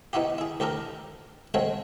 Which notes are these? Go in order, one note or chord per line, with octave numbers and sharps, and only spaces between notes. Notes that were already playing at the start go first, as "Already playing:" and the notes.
B3 D#4 E4 F#4 G4
E4 G#4
D2 G4 A4 A#4 A#5
G#3 A3 C4 F#4 C#5